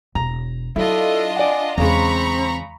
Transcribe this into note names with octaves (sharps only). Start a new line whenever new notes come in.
E1 A#5
F#3 D4 E4 F4 A4 D#5
D5 F#5 G#5
E2 C#3 G#3 C4 A#5 B5 C#6